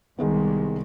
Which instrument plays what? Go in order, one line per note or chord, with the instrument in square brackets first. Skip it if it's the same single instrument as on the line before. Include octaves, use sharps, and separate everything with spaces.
[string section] C2 [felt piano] D#3 G#3 B3